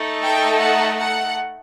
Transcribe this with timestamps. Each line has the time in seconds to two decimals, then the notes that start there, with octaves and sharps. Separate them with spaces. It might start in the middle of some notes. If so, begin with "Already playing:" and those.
Already playing: A3 D#4 A4
0.24 G5
0.61 F#5
0.99 F#5